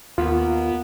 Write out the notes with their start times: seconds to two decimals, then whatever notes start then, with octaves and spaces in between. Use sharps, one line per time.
0.18 D#2 A#3 B3 F4